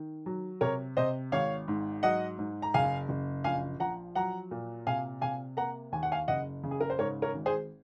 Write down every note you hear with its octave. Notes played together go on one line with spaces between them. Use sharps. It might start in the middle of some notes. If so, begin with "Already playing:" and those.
Already playing: D#3
F#3
C3 A#4 C#5
C3 C5 D#5
G#1 C#5 F5
G#2
F#3 D#5 F#5
G#2
A#5
F#1 F5 G#5
F#1
A#1 F5 G#5
F3 F#5 A#5
F#3 F#5 A#5
A#2
C3 F5 G#5
C3 F5 G#5
A#3 F#5 A#5
D#2 G#5
F#5
F5 G#5
F#1 D#5 F#5
C#3
G#4
A#4
C5
G#2 A#4 C#5
A#4 C#5
G#1
G#4 C5